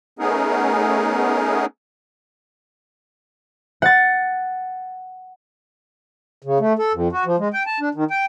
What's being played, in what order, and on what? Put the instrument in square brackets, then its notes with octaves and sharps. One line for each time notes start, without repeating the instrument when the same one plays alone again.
[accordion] A3 B3 C#4 D#4 G#4 A#4
[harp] F#5 A6
[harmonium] C#3
A3
A4
F2
F#4
F3
G#3
G5
A5
D4
D#3
G5